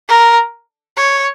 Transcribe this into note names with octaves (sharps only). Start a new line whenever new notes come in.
A#4
C#5